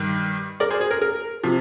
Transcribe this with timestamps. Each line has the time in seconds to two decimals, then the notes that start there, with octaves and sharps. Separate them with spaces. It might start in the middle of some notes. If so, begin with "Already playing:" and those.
Already playing: G2 D#3
0.60 A#4 D5
0.70 G#4 C5
0.81 G#4
0.91 A#4
1.02 A#4
1.43 C3 F3